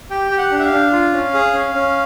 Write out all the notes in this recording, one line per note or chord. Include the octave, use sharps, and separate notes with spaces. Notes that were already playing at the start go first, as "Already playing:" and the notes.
G4 G5
G4
F#5
D4
E5
F5
D4
F4
C#4
G#4
C#4
C#4